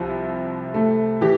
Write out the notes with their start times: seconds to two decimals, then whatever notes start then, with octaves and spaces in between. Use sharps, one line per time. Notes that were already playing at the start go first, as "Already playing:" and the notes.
Already playing: C2 C3 F3
0.74 A3
1.21 E3 G4